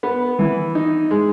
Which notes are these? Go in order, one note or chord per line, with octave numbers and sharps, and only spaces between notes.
B3
E3
D#4
G#3